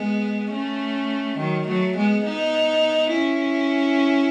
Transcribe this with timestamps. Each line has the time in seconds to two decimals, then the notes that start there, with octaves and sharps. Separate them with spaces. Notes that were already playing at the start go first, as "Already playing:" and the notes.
Already playing: G#3 B3
0.52 A3 C#4
1.38 D#3 F#3
1.68 F#3 A3
1.97 G#3 B3
2.25 B3 D#4
3.12 C#4 E4